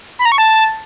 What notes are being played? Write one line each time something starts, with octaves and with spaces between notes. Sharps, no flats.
B5
A#5
C#6
A5